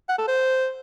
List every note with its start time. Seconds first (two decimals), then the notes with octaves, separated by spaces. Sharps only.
0.09 F#5
0.18 A4
0.28 C5